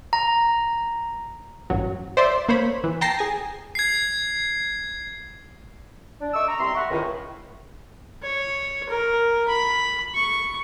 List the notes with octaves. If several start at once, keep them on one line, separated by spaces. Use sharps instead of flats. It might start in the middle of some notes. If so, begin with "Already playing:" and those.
A#5
A1 G2 F#3
C5 D5 E5 C6
A#3 C5 C#5 B5
E3
G5 A5 A#5 A#6 C7
G#4 G#5
G#6 C7
D4
A3 D#5 C#6 D6 E6
A#5
C2 C3 C4 C6
E5 F#5 A#5 B5 C#6
C#2 A2 D#3
C#5
A#4
B5
C#6